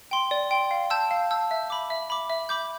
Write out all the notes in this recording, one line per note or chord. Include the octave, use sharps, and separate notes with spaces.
G5 C6
D5
G5 C6
F5
A5 E6 G6
F5
A5 E6 G6
E5
B5 D6
E5
B5 D6
E5
B5 D6 G6